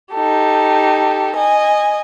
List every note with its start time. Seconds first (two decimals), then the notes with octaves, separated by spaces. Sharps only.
0.14 D#4 G4 A4
1.36 D#5 G#5